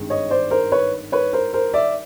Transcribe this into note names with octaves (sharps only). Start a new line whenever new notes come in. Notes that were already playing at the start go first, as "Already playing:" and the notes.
Already playing: G#1 G2 D#3 G#3
C#5 D#5
C5 D5
A#4 C5
B4 C#5
B4 C#5
A#4 C5
A#4 C5
D5 E5